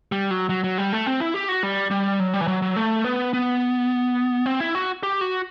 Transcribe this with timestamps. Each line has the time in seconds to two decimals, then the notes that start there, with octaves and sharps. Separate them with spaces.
0.12 G3
0.31 F#3
0.49 F#3
0.64 F#3
0.78 G3
0.93 A3
1.06 C4
1.20 E4
1.34 G4
1.49 F#4
1.63 G3
1.91 G3
2.20 F#3
2.33 G3
2.41 E3
2.48 F#3
2.62 F#3
2.76 A3
3.04 B3
3.33 B3
4.46 C4
4.60 E4
4.75 F#4
5.03 G4
5.21 F#4